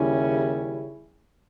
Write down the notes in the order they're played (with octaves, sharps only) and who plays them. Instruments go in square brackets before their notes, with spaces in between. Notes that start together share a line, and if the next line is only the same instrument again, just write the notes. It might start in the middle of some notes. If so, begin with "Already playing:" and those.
Already playing: [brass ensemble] D#2 C#3 G3 C#4 E4